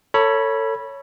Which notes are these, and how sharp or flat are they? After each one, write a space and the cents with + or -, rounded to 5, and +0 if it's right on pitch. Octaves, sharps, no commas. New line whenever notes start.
A4 +30 C#5 +0 B5 -15